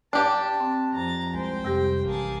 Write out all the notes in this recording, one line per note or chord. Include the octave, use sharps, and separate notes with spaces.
G2 D4 G4 A5
C4
F2 A#5 A6
C2 G#3 C5 G5
F2 C3 G3 G4
A1 A#3 G#4 A5